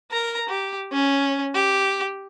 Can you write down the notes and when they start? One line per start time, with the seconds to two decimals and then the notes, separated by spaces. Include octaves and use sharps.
0.11 A#4 A#5
0.49 G4
0.92 C#4
1.55 G4